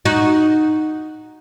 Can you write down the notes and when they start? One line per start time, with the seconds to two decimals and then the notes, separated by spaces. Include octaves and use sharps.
0.05 D#4 F#4